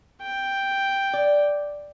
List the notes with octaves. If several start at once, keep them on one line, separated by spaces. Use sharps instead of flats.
G5
D5